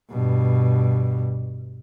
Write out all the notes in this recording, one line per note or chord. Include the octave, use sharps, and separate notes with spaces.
G2 B2